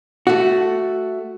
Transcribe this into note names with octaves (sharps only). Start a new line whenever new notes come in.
A3 F#4